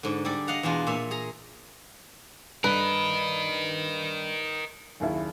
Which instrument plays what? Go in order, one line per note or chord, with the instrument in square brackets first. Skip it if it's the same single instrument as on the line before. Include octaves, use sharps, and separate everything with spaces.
[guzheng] G#2 D3
G3 G#4 A4 D5
D#5 F5 F#5 A#5
E2 B2 G#3 D4 F4
A#2 C#5 E5 G#5
G#4 A#5
[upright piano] G2 [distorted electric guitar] A#4 D#5 [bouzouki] B4
[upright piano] F#1 D#2 E4